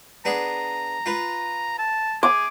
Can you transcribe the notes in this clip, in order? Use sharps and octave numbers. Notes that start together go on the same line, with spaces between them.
B3 D4 G#4 A#5
F4 B4
A5
G#4 D6